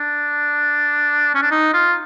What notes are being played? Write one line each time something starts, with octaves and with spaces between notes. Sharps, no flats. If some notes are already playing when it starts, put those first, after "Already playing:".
Already playing: D4
C#4
D4
D#4
F4